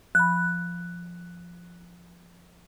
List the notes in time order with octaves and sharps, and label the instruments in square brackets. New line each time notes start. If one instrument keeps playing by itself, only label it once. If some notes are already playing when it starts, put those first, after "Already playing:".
[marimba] F3 B5 [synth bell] F#6